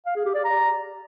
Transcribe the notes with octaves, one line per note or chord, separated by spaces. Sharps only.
F5
G#4
G4
D5
A#5